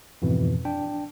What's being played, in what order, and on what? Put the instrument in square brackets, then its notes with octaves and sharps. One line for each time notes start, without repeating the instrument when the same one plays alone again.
[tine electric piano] F2 G#2 B2 E3
D4 G5